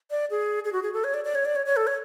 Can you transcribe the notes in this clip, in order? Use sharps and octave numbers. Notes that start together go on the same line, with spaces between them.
D5
G#4
G#4
F#4
G#4
A4
C#5
D5
D5
C#5
D5
C#5
C#5
A4
C#5